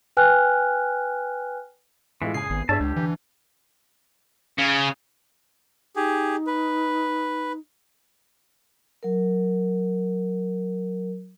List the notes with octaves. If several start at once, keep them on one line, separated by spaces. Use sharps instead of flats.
B4 G5 G#5 F6 F#6
A2 E3 G#3 F4
F#1 G#4 G#5 C7
G#1 B3
G2 D4 G#4 C#5 D5 E5 A5
C#2 G2 G4
D2 E3
C#3
D#4 G4 G#4
B4
F#3 A#4